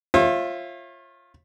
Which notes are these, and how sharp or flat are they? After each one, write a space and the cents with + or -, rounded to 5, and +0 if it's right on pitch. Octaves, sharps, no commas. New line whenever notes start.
F4 +0 C#5 -40 E5 +0